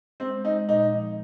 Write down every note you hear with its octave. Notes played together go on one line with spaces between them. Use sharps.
G#3 C4
G#3 D#4
A#2 D#4
F3